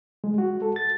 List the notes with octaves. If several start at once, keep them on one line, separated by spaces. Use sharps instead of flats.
G#3
F#4
A4
A6